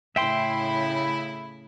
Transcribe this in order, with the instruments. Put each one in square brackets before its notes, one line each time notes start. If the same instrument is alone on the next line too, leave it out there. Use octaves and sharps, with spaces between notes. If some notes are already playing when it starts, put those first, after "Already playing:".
[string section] A2 C#3 E4 [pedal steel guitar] E5 G5 C6